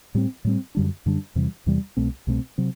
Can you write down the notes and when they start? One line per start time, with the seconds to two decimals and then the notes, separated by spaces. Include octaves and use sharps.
0.14 A2 G3 C4
0.45 A2 G3 C4
0.75 F#2 D3 G3 D4
1.06 F#2 D3 G3 D4
1.35 E2 C3 E3 G3
1.66 E2 C3 E3 G3
1.97 C2 B2 A3 C4
2.27 C2 B2 A3 C4
2.58 C3 F#3 C4